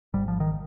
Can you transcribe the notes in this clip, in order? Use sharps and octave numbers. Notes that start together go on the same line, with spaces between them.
G#1 G#2 G3
F3
D#3